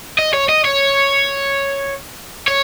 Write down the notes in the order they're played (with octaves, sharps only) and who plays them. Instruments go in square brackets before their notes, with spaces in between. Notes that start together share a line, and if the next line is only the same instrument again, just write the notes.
[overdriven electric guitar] D#5
C#5
D#5
C#5
C#5